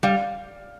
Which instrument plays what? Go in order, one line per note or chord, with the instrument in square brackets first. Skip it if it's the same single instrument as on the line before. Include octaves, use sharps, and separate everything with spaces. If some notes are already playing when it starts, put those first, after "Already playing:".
[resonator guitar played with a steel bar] G3 [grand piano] F5